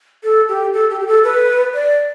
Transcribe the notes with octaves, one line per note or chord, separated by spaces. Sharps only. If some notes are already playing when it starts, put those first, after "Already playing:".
A4
G4
A4
G4
G4
A4
B4
D5